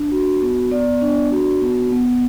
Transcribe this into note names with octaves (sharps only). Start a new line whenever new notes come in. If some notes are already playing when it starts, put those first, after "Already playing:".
Already playing: D4
F#4
B3
B3 D5
D4
F#4
B3
B3